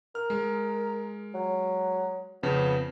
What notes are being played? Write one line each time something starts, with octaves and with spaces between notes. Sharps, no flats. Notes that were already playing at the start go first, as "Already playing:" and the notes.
A#4 F6
G#3
F#3
F2 C#3 B3